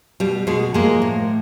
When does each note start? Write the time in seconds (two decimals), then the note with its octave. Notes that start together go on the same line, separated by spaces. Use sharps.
0.20 B2 G3
0.47 B2 G#3
0.74 F3 G#3 A#3
1.02 A2